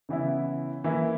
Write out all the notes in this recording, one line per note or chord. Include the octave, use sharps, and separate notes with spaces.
C#3 E3 B3 E4
E3 A#3 E4